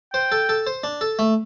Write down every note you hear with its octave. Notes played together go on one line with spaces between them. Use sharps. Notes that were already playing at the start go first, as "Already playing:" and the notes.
C5 G5
A4
A4
C5
D4
A4
A3